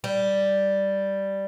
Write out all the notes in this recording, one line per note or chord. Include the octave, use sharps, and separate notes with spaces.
G3